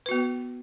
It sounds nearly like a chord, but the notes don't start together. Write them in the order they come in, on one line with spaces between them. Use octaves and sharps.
B4 F#4 B3